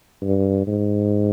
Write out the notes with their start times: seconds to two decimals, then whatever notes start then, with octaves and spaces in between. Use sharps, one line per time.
0.22 G2
0.67 G#2